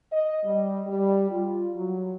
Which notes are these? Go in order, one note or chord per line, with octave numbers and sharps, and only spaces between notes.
D#5
G3
G3
F4
F#3